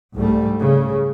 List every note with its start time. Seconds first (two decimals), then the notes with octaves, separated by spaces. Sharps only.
0.15 C2 G#2 G3 A3
0.59 C#3